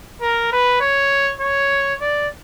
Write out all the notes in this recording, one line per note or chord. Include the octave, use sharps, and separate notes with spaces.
A#4
B4
C#5
C#5
D5